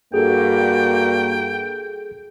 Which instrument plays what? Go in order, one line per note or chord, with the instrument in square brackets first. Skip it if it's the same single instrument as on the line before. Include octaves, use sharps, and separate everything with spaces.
[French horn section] G2 F#4 [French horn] A#3 [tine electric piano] G#4 A4 [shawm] G5